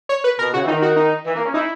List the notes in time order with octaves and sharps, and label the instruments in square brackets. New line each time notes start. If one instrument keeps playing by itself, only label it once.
[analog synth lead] C#5
B4
[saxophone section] B2 [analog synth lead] A#4
[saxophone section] C#3 [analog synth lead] F#4
[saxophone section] E3
[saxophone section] D#3 [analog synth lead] D#4
[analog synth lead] F#4
D#4
[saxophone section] E3
A#3
C#4
[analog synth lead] D#4 [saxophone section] E4